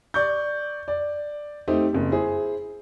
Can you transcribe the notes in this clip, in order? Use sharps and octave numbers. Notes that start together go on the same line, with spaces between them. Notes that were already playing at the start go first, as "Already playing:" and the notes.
D5 C#6 G6
D5
A3 C4 D#4 G4
F#1 F2
E4 G#4 C5